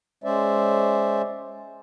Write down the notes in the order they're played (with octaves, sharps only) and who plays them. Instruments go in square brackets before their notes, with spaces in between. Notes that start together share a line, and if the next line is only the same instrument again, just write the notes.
[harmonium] G#3 C#4 C5 D5 E5